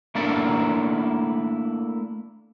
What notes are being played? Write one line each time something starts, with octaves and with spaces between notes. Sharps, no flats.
A3 A#3 D4 E4 D5